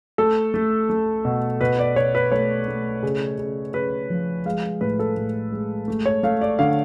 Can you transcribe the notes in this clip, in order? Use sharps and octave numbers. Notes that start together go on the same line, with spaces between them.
A3 A4
A3
A3
B2
B2 B4
D5
B2 C#5
B4
A3 C#5
A3
C#3
C#3
C#3 B4
F3
G#3 F5
A2 B4
A4
A2
G#3
A3
C#5
A3 F5
D5
D3 F5